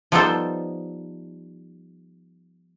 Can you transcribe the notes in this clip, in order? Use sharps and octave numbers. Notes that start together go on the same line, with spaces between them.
F3 G3 B3 D#4 A4 C5